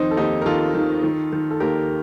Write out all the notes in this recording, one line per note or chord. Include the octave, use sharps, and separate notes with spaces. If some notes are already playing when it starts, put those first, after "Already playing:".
Already playing: F2 D#3 C4 D#4
A4
D#2 D#4 G4
A#4
D#3 F4 A4
D#3
D#3
D#3
A4
D#2 G4 A#4